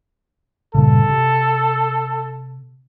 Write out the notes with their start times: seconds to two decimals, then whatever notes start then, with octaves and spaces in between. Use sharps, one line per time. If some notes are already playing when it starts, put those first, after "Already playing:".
0.75 G2 A#2 C#3 A4
1.10 C3